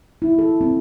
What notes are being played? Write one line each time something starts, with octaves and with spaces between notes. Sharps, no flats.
E4
A4
C4